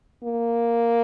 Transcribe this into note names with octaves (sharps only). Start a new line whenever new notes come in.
A#3